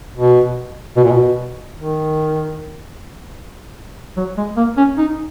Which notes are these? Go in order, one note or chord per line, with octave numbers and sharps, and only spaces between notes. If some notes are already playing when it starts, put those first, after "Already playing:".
B2
B2
A#2
B2
D#3
F#3
G#3
A#3
C#4
D#4